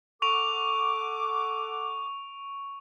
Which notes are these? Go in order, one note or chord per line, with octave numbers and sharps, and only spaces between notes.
A4 F#5 C#6 D6 D7 F7